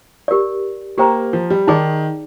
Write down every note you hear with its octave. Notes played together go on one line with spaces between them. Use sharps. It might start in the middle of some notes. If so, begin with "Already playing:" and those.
G4 A#4 D5
A#3 G4 C5 G5 A#5
F3
G3
D#3 D#4 G#4 D5